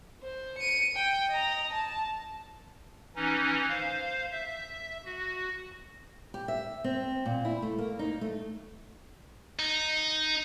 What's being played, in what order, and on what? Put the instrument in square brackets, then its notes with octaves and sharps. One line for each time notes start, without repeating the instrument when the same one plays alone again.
[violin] C5
C#7 D#7
G5
D#5 A#5
A5
[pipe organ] E3 C#4 D#4
C5 F5
E5
F#4
[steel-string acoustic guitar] G4
E5
C4
A#2
E4
A3
A#3
D#4
A3
[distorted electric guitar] D#4